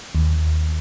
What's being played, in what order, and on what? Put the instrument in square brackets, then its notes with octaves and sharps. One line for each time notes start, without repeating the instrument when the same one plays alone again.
[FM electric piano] D#2